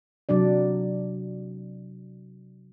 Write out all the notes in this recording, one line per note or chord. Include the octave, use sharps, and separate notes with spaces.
C3 F#3 D4 D5